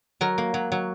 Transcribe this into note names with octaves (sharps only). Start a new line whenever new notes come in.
F#3 A#4
A#3
F#3
F#3